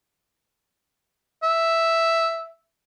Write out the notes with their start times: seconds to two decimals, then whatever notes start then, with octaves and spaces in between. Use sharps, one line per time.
1.43 E5